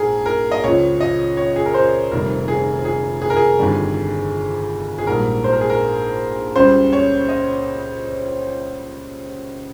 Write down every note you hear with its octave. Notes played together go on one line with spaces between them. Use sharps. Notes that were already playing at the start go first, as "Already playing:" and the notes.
Already playing: A#1 G#2 G#4 A#4
A#4
D#5
C#2 C#3 F3 C#5
D#5
C#5
G#4
A#4
C5
F1 F2 D#3 G3 A#4
G#4
G#4
G#4
A#4
G#4
G1 F2 D#3 G3
G#4
A#1 G#2 G3 A#4
C5
A#4
G#4
A#4
C#2 C#3 G3 C5
C#5
D#5